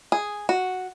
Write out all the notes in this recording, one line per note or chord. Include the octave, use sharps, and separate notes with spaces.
G#4
F#4